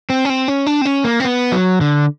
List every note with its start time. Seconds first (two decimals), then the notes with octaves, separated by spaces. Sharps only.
0.10 C4
0.25 C#4
0.30 C4
0.48 C#4
0.66 D4
0.81 C4
0.85 C#4
1.04 A#3
1.20 C4
1.25 B3
1.52 F#3
1.81 D3